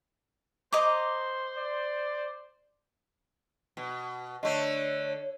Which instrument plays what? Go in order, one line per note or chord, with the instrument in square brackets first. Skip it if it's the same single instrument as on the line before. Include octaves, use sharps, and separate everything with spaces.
[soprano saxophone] C5 [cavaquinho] D#5 A#5 D6
[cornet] D5
[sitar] B2
[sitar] D3 A3 [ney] C#5 [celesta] D#5